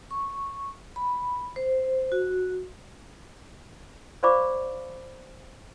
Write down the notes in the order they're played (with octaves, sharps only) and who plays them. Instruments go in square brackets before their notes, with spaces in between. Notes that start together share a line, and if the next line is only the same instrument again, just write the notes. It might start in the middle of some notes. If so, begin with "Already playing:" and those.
[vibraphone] C#6
B5
C5
F#4
[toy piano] C5 D5 F5 B5 C#6 D6